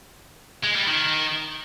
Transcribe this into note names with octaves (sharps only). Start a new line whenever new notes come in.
G#3
G3
D#3